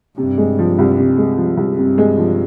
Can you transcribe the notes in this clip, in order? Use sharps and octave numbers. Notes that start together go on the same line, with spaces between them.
G2 C3
G#3
F3
C2
C3
G#3
F3
C2
G2 C3
G#3
F3